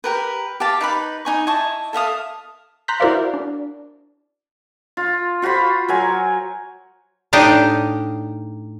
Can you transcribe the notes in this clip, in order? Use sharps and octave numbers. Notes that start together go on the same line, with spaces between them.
G4 A#4 B4
G4 F5 A5
D#4 B4 B5
D#4 G#5 C#6
E4 D#5 A5 C#6
A4 E5 F5 D#6
A#5 C6 F#6 G6 B6
E4 F#4 A#4 C5 D5 F5
D4
F4
F4 F#4 C5 B5
F#3 A#4 G#5
A2 D4 D#4 G4 D#5 F5